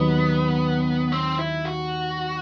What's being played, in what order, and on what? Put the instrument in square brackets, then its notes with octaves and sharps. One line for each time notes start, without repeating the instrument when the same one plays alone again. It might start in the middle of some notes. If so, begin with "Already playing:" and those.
Already playing: [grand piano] D#2 D#3 F#3 [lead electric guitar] B3
[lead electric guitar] C4
E4
F#4